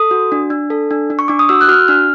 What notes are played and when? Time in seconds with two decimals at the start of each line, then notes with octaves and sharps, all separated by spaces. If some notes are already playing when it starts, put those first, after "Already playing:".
Already playing: A4 D#6
0.11 F#4
0.32 D4
0.50 D4
0.70 A4
0.91 D4
1.10 D4
1.19 C#6
1.28 D4 D6
1.39 D#6
1.49 F#4 E6
1.61 F#6
1.68 F#4 F6
1.88 D4 F6